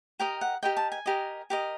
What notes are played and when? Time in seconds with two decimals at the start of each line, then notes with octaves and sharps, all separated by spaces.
0.20 G4 A#4 D#5 G5
0.41 F#5
0.63 G4 A#4 D#5 G5
0.77 A5
0.92 G#5
1.06 G4 A#4 D#5
1.50 G4 A#4 D#5